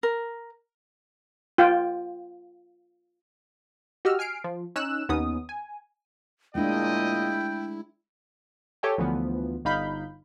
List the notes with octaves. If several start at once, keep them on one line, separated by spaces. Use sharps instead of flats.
A#4
F4 G5
F#4 G4 D#5 E6 F6
G#5 F6 C7 D7
F3
C#4 D#4 E6 F#6 E7
D#2 B3 C#4 D#4 D#6
G#5
A#2 G#3 A3 D4 E4 F4 D#5 G5
G4 A4 C#5 E5 G5 G#5
D2 E3 F3 B3
G1 D#4 F5 B5 G6